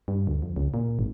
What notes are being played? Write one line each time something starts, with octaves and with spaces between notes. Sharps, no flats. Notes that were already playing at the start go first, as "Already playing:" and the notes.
G2
D2
F2
C#2
A#2
G#1